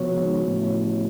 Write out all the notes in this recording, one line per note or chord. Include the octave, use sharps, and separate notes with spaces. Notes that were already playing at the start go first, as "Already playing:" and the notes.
Already playing: C#3 F3 B3 F#4 C#5
G#1 G#2
A1 A2